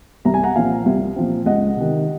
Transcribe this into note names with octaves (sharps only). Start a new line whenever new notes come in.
C2 A#5
G#5
F#5 A#5
A#2 F3 C4 F5 G#5
C2
A#2 F3 C4
C#2 D#5 F#5
C3 D#3